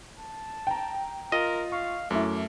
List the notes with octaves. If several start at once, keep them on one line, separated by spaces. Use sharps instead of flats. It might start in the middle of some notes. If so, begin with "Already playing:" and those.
A5
G5 A#5
F4 A#4 D#5
F5 C#6
F#2 A3 E4 D6